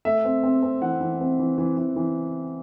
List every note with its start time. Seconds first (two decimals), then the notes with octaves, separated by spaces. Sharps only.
0.05 A3 E5
0.25 C4
0.43 C4
0.63 C4
0.82 E3 F#5
1.01 E3
1.20 C4
1.39 E3
1.58 E3
1.77 E3
1.96 E3